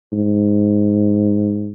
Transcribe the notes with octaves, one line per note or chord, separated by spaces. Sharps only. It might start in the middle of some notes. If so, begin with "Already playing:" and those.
G#2